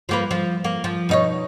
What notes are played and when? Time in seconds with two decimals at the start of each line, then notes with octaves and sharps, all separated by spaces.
0.09 F3 A#3 B4
0.31 F3
0.64 A#3
0.84 F3
1.09 B2 D#4 C#5